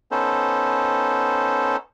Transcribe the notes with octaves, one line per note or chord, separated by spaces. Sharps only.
B3 C#4 D#4 A4 C5